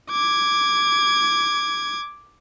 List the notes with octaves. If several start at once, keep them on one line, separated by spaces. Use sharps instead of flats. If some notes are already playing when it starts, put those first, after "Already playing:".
D6 G#6